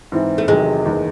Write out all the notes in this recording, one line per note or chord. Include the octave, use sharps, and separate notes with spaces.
G#2 E3 C4 E4
A3
E2 C3 D#3 F#3 G#3
F#1 E2 D#3